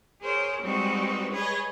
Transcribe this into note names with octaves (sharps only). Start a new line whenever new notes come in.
G#4 A#4 C5 C#5
G3 G#3 C4 D#4 F#4 B4
G#4 B4 C#5 D#5